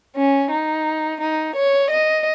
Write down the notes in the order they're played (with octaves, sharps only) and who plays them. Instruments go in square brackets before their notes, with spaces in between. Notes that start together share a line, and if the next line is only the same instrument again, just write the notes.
[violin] C#4
D#4
D#4
C#5
D#5